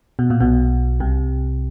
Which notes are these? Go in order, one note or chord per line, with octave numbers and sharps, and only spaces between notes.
B2
A#2
B1 B2
C2 C3